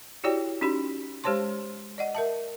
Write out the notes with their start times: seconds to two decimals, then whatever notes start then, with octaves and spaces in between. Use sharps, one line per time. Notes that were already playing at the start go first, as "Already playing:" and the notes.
0.24 E4 F#4 G4 C#5 D5 G5
0.61 C#4 D#4 F#4 G4 B5
1.24 G#3 G4 C5 C#5 A5 C6
1.98 D5 D#5 F#5
2.15 A#4 E5 A5